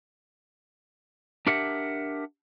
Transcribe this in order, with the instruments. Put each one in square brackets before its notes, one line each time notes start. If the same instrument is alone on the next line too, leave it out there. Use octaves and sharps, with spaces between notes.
[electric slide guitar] D4 G4 A#4 E5 F#5